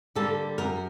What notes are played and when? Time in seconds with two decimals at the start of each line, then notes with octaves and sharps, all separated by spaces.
0.15 D3 G3 A#3 A4
0.58 F#2 A#4